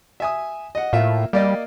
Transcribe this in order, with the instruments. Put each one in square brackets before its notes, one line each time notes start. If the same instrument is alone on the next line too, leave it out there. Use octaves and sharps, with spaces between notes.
[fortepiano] E5 G#5 D#6
D#5 F#5
[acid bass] A2 [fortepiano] A#3 F4 E5
[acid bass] G3 [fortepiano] A#3 D5 D#5